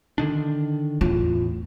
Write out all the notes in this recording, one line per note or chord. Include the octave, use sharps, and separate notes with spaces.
D3 D#3 D4
E2 A2 F4